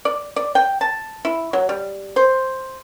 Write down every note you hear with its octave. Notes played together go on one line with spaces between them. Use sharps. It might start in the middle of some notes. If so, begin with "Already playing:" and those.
D5
D5
G5
A5
E4
F#3
G3
C5